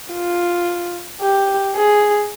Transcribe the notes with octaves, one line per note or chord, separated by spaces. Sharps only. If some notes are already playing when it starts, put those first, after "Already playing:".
F4
G4
G#4